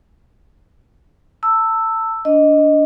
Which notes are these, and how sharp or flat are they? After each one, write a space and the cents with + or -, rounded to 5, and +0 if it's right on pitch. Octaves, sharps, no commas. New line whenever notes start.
A5 +30 E6 +0
D4 -20 D#5 +0